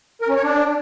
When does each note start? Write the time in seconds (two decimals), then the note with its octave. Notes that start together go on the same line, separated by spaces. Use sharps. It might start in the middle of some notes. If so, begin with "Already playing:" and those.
0.21 A#4
0.28 C#4
0.36 C#5
0.43 D4